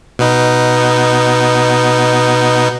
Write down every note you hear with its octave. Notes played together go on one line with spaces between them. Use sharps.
B2 B3 D#4